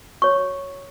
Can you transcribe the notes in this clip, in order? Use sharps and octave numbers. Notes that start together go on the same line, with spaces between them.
F#4 C#5 C#6